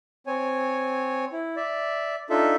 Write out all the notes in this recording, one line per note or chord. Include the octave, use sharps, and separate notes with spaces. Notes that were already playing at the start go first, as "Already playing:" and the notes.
C4 C#5 G#5
E4
D5 E5
D4 D#4 F4 A4 E5